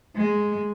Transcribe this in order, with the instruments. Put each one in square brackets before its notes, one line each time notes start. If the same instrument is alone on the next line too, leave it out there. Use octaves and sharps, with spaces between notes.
[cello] G#3